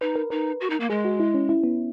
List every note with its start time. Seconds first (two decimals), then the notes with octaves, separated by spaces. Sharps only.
0.01 D#4 B4
0.16 A#4
0.30 D#4 A#4
0.61 F#4
0.70 D#4
0.80 A#3
0.90 G#3 G#4
1.05 F#4
1.20 E4
1.34 C#4
1.49 E4
1.64 B3